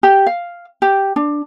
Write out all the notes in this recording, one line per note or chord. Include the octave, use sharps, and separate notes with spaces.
G4
F5
G4
D4